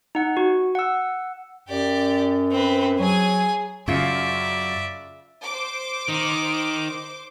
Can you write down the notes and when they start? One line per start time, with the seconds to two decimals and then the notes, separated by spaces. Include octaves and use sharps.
0.15 D#4 F#5
0.37 F#4
0.75 F#5 E6
1.69 F#2 G4 D5
2.52 C4 B4
2.99 F#3 G#4 G#5
3.88 F#2 C#3 F4 D5 E5
5.42 C5 D6
6.08 D#3 D#4